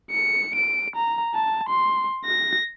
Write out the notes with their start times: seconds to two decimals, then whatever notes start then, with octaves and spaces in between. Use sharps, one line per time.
0.11 C#7
0.55 D7
0.95 A#5
1.34 A5
1.69 C6
2.25 A#6